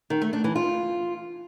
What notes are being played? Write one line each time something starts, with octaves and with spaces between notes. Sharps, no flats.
D#3
A3
D4
E3
F4